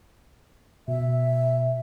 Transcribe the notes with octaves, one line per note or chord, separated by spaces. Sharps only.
B2 E5